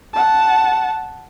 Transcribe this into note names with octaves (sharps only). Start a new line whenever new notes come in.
F#5 A5